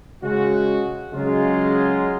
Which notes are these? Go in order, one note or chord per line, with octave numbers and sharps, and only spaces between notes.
C#3 G#3 F#4
C#3 F#3 G#3 F4